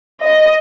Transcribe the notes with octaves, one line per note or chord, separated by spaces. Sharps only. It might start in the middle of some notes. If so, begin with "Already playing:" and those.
D#5